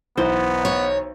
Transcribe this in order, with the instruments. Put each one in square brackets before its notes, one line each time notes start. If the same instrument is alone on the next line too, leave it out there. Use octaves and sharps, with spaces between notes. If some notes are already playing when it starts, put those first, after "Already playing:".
[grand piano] B1 E3 [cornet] B3 [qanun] C5
[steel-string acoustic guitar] C#5